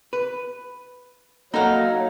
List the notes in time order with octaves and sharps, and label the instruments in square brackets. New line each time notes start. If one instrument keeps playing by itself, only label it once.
[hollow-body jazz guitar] B4
[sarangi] F#3 [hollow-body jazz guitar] A#3 A4 F#5 [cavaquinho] D#4 F5